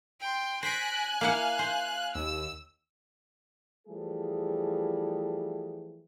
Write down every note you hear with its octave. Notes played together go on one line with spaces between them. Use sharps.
G5 C6
C5 G#5 F#6 A#6 B6 D7
A#3 E4 F5 F#5 F6
C5
D#2 E6
E3 F3 G3 A3 G#4